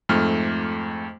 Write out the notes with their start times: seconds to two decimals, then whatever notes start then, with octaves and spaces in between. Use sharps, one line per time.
0.09 F2 G#2 A3 F6